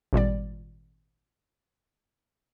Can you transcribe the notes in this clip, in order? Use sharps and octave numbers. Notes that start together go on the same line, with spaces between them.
G#1 A#2 G3 D5